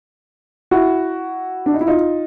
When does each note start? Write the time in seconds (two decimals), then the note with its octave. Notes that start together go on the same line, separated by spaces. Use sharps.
0.71 E4 F#4
1.66 D4
1.74 D#4
1.81 E4
1.88 D#4 F4